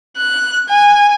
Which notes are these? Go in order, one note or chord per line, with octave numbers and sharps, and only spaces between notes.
F#6
G#5